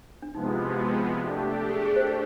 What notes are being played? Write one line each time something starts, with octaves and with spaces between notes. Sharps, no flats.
D4
C3 F3 G#3 B3 D#4
E4
G4
F#4
A3 D4 G4
A4
G#4
G#4
C5
D5